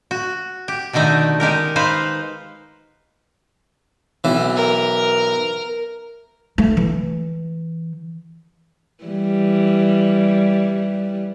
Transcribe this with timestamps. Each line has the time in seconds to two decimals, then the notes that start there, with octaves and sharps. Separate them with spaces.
0.11 F#4
0.68 G4
0.93 B2 D3 D#3 A3 D#4
1.40 G#3 D#4 G4 A#4
1.76 D#4 B4 C5 F5
4.24 B1 E3
4.56 A#4
6.58 A3
6.77 E3
9.04 E3 G3